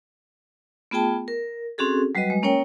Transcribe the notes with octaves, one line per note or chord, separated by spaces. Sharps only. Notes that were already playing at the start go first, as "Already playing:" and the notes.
A3 B3 F4 G#4 G5 A5
A#4
C4 C#4 F#4 G#4 A4
F#3 G3 F#4 B4 D#5
G#3
A#3 C#4 A#4 C#5 G5